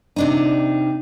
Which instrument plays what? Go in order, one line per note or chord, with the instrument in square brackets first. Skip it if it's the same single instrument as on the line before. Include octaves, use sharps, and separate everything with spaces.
[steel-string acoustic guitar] C3 D4 D#4